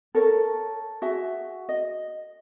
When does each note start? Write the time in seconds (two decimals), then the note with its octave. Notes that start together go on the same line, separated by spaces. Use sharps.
0.15 A4 A#4 C#5
1.02 F#4 G#4 E5
1.69 D#5